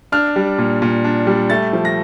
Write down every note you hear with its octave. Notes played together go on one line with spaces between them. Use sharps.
D4 F6
G3
A#2
A#2
D4
G3
A3 A6
F3
A#6